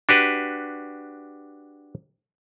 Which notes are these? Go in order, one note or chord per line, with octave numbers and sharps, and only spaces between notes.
D4 F#4 G4 B4